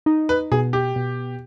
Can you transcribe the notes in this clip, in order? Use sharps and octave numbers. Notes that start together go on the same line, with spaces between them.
D#4
B4
B2 G#4
G4
B2